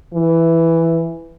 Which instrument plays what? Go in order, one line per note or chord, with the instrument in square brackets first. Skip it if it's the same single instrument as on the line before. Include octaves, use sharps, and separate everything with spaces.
[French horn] E3